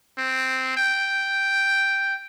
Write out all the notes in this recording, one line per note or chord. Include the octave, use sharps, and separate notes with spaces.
C4
G5